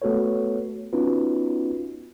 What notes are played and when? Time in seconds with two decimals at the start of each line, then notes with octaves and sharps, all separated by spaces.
0.02 A3 B3 F#4 A4 B4 C#5
0.93 B3 C#4 D#4 F4 F#4 B4